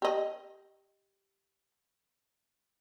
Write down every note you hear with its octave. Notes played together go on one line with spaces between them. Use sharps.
G4 D#5